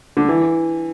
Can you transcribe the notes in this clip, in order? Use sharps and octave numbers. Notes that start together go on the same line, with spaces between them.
D3
E3